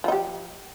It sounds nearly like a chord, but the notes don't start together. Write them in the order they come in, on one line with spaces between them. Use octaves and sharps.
F3 D#4 G4